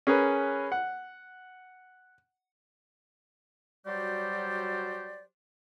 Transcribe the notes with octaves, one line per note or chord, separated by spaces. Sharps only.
C#4 G#4 A#4 B4
F#5
F#3 G3 F#4 G4 C5 D5